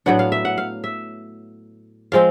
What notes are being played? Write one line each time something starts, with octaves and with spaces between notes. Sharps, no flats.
A2 F#3 B3 D4 F#5
F5
E5
F#5
F5
E5
F3 G#3 C4 F5